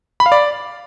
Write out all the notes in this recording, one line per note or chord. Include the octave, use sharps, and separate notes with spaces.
B5
F5
D5